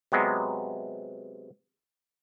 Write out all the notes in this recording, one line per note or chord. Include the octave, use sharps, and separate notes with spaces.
C3 F#3 G#3 B3